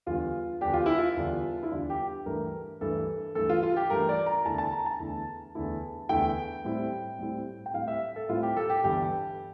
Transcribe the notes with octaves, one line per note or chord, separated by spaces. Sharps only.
E2 D3 G3 D4 F4
E2 D3 G3 D4 G4
F4
E4
F4
E2 D3 G3 D4
E4
E2 D3 G3 D4 F4
G4
G2 E3 A3 A#4
G2 E3 A3 A4
G2 E3 A3 A4
F4
F4
G4
G2 E3 A3 A#4
D5
A#5
E2 D3 A3 E4 A5
A5
A#5
A5
E2 D3 A3 E4
E2 D3 A3 E4
E2 D3 A3 E4 G5
A2 G3 C4 E4
A2 G3 C4 E4
G5
A2 G3 C4 E4 F5
E5
A4
A2 G3 C4 E4 F4
G4
A4
G4
G1 G2 E3 G3 G4